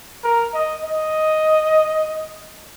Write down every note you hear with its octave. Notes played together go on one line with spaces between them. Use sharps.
A#4
D#5
D#5